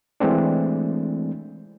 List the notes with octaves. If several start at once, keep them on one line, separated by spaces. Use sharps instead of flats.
E3 G#3 A3 C4 D4